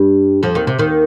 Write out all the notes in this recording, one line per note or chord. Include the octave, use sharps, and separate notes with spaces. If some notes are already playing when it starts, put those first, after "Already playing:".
Already playing: G2 G3
F2 F3
D#2 D#3
C3
D#2 D#3